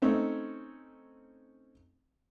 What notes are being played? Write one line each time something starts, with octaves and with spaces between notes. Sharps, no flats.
A3 C4 C#4 D#4